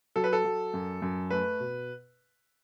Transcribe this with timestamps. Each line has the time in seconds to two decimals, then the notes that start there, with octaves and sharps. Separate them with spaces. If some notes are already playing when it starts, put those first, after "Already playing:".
0.16 F#3 A4
0.24 B4
0.33 A4
0.44 F#3
0.74 F#2
1.02 F#2
1.30 A3 B4
1.60 B2